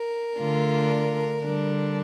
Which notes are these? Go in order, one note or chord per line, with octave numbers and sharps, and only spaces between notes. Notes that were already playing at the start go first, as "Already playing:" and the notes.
Already playing: A#4
D3 A3 D4 F4
D3 G3 D4